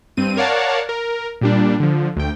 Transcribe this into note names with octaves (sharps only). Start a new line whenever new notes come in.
G2 C4 D#7
A#4 C#5 D5 F5 F#5 A5
A#4
A#2 G3 D4
D3 F3
D2 G5